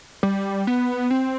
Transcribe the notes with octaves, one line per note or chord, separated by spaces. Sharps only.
G3
B3
C4